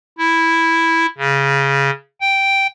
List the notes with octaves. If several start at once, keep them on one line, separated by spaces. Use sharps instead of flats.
E4
C#3
G5